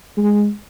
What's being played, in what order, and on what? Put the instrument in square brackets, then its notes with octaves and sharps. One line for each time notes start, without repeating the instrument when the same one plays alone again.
[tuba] G#3